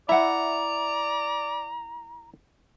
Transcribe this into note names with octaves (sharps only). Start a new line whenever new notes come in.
E4 D5 E5 F#5 A#5